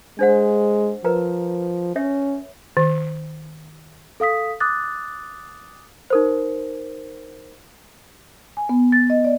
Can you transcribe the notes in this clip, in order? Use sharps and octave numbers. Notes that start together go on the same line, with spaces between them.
G#3 D4 C5 F#5
F3 A#4 B4 A#5
C#4 C#5 E5
D#3
A4 F5 D#6 B6
D6 D#6 F#6 A6
D#4 A#4 C5
G#5
B3
A6
D#5
D5